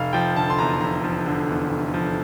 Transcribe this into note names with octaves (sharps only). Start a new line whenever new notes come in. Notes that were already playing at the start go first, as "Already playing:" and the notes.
Already playing: F1 F5
F3 G5
D3 A5
C6
E2 A#5
F1 A#5
F3
D3
E2
F1
F3